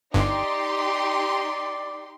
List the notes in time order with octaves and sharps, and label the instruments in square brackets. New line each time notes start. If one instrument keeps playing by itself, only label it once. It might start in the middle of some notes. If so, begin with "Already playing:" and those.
[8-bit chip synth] G1 G2 [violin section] D#4 G4 C6 [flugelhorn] D5